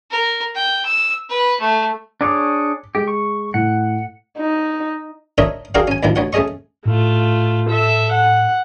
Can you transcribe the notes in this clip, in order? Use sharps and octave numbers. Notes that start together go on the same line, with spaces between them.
A#4
G5
E6
B4
A3
D4 G#4 C#5 D6
G#3 G4
C#6
A2 F#5
D#4
D4 D#4 A#4 C#5 E5
D4 F#4 G#4 A#4 F5 G5
C#4 G#5
D2 A2 D#3 F3
D2 C#5 F#5
A3 C#4 G#4 D#5 C#6
A2 A3 F4
A4 E5
F#5